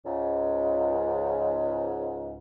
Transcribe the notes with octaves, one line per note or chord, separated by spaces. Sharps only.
C#2 G#2